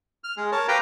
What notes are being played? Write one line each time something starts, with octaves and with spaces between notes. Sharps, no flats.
F6
G#3 G#4
A#4 C#5 A5
G4 B4 F5 G5 A#5